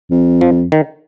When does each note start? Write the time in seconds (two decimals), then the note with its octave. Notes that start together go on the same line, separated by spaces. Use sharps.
0.11 F2
0.41 F3
0.72 D#3